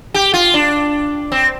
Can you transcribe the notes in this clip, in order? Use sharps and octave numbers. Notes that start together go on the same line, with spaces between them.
G4
F4
D4
C4